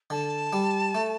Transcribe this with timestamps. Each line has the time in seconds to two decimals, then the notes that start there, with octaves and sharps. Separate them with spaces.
0.10 D3 A5
0.53 G3
0.95 A3